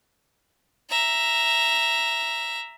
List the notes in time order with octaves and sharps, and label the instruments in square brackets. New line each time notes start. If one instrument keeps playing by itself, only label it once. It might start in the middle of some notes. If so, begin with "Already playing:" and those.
[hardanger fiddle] E5 A#5